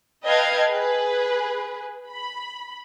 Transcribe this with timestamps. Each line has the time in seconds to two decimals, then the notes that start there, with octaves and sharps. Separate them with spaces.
0.24 B4 D#5 F5 G5 A5 G#6
0.69 G#4 B4
2.09 B5